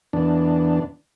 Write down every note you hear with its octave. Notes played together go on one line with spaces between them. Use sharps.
E2 D4